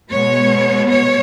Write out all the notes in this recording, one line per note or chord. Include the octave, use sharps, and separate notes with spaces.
B2 G#3 B3 C#5
C#5